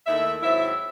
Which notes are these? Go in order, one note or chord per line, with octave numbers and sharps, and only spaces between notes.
D#2 D#3 A3 E4 E5
G#2 F#3 C4 E4 E5